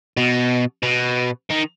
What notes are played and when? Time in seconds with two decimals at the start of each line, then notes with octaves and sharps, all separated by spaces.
0.17 B2
0.83 B2
1.51 D#3